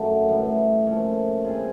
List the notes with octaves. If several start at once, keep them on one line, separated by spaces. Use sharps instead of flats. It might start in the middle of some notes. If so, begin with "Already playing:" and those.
Already playing: F#2 D3 F#3 A3
A2 E3 G3
A#2 F3 A3 C#4
G3 C4 F4 G#4